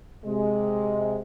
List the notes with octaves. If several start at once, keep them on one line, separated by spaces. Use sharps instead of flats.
C3 G#3